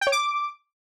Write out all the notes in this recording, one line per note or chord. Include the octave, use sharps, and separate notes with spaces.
G5
C#5
D6